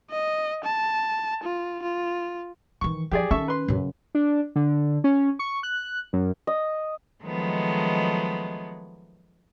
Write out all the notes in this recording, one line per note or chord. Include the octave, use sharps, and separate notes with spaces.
D#5
A5
F4
F4
D#3 E3 C#6
F3 G4 G#4 D5
D#3 C#4 A4 E5 C#6
B4 C6
F#2 C#3
D4
D3
C#4
C#6
F#6
F#2
D#5
D#3 F3 F#3 G#3 A3 B3